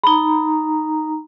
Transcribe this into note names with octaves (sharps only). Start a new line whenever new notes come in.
D#4 A#5 B5